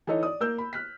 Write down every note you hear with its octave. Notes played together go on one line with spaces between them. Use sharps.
E3 D#4 A4 C#5 D#5
D5 D#6
A#3 A#4 E6 G6
B5
F6 F#6 B6